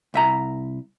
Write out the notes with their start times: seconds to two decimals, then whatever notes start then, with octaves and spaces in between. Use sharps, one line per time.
0.14 C2 E5 A#5